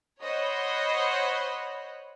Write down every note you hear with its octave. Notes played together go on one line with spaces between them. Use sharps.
C5 C#5 D#5 F#5 B5